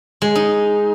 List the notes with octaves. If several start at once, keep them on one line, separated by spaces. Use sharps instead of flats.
G#3
D#4